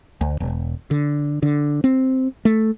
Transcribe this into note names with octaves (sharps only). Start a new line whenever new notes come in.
D2
E1
D3
D3
C4
A3